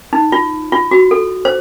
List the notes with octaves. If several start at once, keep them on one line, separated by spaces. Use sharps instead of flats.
D#4
F4
F4
F#4
A4
C5